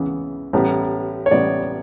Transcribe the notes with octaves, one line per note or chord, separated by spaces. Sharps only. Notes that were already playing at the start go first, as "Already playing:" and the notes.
Already playing: C#2 C#3 E3 B3
A1 A2 G3 B3
C#5
A1 A2 G3 B3 D5